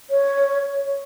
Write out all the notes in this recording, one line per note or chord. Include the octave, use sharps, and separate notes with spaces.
C#5